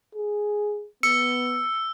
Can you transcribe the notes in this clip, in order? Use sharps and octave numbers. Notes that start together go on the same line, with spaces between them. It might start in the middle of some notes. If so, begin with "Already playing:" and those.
G#4
B3 E6 C#7